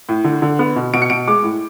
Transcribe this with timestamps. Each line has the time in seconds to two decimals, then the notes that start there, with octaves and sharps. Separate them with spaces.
0.09 A2
0.24 D3
0.42 D3
0.59 B3
0.76 B2
0.93 B2 D7
1.02 C#7
1.10 B2 D7
1.28 G#3 D6
1.43 A2